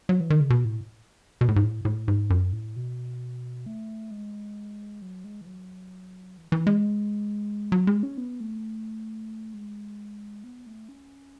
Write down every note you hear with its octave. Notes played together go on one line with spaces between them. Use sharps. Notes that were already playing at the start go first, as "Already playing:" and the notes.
F#3
E3
D#3
C#3
B2
A2
B2
A2
G#2
A2
A2
G#2
F#2
A2
B2
A3
G#3
F#3
G#3
E3
F#3
E3
E3
G#3
F#3
G#3
C#4
B3
A3
G#3
B3
A3
C#4